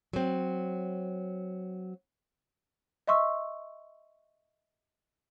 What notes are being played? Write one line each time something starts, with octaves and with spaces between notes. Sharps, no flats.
F#3 C4
D#5 E5 C6 C#6 E6